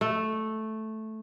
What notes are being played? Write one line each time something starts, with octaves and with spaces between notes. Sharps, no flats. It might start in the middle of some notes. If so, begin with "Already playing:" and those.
A3